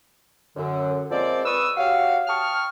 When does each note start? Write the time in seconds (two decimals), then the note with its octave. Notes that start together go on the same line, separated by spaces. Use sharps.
0.56 F#2 D3
1.11 F3 G#3 A#3 C4 C5 D5
1.45 B4 C#6 D#6 E6
1.77 F#4 G4 C#5 F5
2.27 G5 A5 C#6 D#6 F6